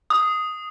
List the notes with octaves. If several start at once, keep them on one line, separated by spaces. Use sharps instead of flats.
D#6